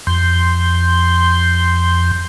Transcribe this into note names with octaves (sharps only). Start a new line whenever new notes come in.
F2 C6 G6